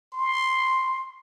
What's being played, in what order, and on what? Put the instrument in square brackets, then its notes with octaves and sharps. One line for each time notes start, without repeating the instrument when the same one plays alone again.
[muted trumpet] C6